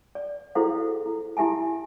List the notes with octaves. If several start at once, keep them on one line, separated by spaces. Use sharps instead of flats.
D5
E4 F#4 G#4 A4 C5 F5
E4
E4 G4 E5 G#5 A5